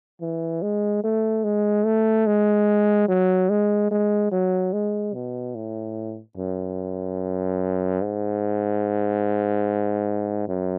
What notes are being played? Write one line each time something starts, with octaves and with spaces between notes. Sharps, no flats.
E3
G#3
A3
G#3
A3
G#3
F#3
G#3
G#3
F#3
G#3
B2
A2
F#2
G#2
F#2